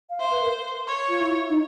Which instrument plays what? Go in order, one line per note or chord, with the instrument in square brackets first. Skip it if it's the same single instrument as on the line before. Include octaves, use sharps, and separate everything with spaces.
[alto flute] F5
[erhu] C5 [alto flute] E5
[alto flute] B4
A#4
[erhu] C#5
[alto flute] F4
E4
D#4